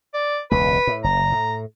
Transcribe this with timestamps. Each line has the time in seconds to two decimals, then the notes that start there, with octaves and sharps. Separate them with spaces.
0.14 D5
0.51 E1 C#2 B4
0.87 A2
1.04 F#1 A#5
1.32 A2